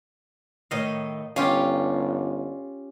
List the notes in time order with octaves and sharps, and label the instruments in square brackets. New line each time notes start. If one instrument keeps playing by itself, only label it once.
[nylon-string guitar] A2 D#3 C#5 [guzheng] D#5 F5
[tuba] G1 [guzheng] C#4 F4 G4 [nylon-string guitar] F5